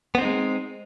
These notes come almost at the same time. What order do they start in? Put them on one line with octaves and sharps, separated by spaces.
B3 C4 D#4 G#3